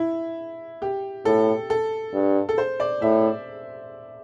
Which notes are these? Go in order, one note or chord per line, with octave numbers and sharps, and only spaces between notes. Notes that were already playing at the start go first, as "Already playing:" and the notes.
Already playing: E4
G4
A2 A4
A4
G2
A4
C5
D5
A2 E5